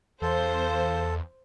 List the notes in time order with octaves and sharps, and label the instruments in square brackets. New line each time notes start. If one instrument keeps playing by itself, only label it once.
[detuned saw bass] E2 [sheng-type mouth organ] A4 [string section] C5 [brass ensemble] F5